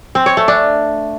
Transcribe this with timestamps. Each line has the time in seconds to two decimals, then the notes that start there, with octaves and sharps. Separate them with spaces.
0.15 C4
0.26 C#5
0.37 A3
0.48 D4